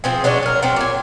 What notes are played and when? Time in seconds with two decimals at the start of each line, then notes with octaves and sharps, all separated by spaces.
0.04 F3 C4 G#4
0.24 F#3 G#3 C#4 D4
0.43 G#4 A#4
0.62 F#3 C4
0.76 A#2 G#5